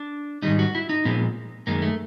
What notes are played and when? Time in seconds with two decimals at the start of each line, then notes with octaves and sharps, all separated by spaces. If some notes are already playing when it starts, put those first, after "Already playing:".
Already playing: D4
0.42 G#2 D#3 G3 D#4
0.59 F#4
0.75 E4
0.89 D#4
1.05 A#2 F3 G#3 B3
1.67 F#2 D#3 G#3 A#3
1.82 A3